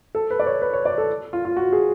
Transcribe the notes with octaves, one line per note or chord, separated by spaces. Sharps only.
A4
B4
D5
C#5
B4
C#5
D5
A4
F4
F4
F#4
G#4